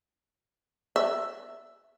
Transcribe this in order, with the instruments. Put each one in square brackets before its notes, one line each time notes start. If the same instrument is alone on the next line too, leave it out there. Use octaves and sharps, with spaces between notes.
[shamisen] E5